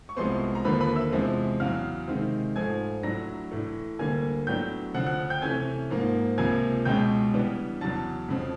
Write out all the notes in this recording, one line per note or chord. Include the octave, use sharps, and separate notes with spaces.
C#6
C2 C3 F3 G#3 B3 C5 C6
A#5
D#2 D3 F3 A#3 B4 B5
B4 B5
E5 E6
E2 C3 F3 G#3
E2 C#3 F#3 F5 F6
C3 D#3 G#3
G#2 F3 A3 G#5 G#6
A2 F#3 A3 D4 A#5 A#6
A2 E3 A3
D2 D3 G3 A#3 G#5 G#6
A2 F#3 B3 D4 G5 G6
D2 C#3 F3 F#5 F#6
F#5 F#6
G5 G6
C3 E3 A3 C#4 G#5 G#6
G#2 F3 A#3
C#2 C3 F3 A#3 G#5 G#6
C#2 B2 G#3 C#4 G5 G6
C#3 E3 G3 B3 D4
E2 C#3 F#3 A5 A6
F2 C#3 F3